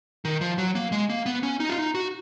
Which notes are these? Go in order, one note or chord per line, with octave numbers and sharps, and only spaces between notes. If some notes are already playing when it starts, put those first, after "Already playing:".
D#3
F3
F#3
A#3
G#3
A#3
B3
C#4
D#4
F4
D#4
F#4